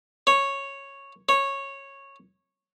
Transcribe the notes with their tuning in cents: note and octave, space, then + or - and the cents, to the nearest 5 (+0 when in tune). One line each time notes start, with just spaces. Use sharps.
C#5 -5
C#5 -10